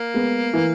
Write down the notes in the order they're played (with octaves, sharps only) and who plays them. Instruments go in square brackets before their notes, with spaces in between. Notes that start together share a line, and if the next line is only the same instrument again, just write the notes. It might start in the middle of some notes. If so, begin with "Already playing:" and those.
Already playing: [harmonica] A#3
[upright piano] G#3 B3
E3